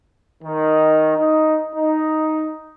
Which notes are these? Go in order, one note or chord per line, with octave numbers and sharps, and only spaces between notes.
D#3
D#4
D#4